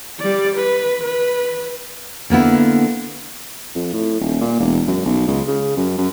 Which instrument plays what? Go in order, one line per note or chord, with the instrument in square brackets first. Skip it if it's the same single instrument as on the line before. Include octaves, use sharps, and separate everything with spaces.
[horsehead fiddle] G3 D5
B4
B4
[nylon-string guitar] D3 A#3 B3 E4
[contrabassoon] F2
A2
D#1
A#2
E1
F#2
B1
C#2
C#3
F#2
F#2